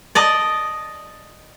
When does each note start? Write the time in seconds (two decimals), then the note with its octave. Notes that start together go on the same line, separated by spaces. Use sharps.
0.15 D5 D#5 A5